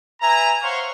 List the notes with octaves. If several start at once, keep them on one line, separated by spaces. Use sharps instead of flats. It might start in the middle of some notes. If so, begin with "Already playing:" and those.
B4 E5 G#5 A#5
C5 C#5 F5 F#5 C6 C#6